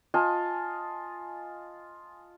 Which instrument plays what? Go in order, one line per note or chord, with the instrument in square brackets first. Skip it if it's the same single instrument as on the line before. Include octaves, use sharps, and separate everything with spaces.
[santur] F4 D#5 G#5 A5